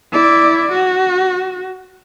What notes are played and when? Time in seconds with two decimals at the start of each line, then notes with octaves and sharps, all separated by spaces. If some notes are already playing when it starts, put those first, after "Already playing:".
0.12 E4 D5
0.73 F#4